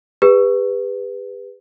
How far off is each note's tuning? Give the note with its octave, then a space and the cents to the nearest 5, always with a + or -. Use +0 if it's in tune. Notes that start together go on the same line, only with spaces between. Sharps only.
G4 +45 B4 +0